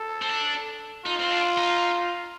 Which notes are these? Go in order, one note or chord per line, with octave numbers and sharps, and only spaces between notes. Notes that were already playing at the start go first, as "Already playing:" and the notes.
Already playing: A4
C4
D4
D#4 F4
C4
D4
D#4